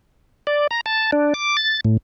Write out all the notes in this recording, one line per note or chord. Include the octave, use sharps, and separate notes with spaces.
D5
A#5
A5
D4
D6
A6
A2